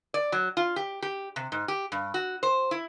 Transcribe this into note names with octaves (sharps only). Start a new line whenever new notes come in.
D5
F#3
F4
G4
G4
C3
G#2
G4
G2
F#4
C5
E4